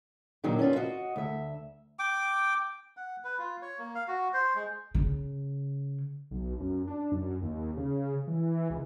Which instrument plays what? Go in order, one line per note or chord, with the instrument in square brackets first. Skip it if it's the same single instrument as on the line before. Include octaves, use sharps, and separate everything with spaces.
[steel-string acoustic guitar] A#2 D#3 F#3 D4 D#4
C#4 D4 F4 B4
F#4 D#5
D2 E5
[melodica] G5 D6
F#5
B4
F4
C#5
A#3
F5
F#4
C5
G#3
[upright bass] C#3
[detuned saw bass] B1
F#2
D4
F#2
D#2
C#3
E3
C#2